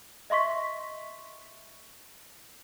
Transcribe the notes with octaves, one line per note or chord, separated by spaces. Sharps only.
D#5 E5 C6 C#6 B6